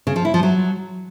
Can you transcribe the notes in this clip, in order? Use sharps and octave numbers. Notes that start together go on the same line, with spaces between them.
C#3
F3
E4
F3
F#3